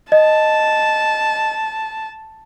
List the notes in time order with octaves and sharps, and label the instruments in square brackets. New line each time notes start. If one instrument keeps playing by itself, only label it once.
[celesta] D#5 [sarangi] A5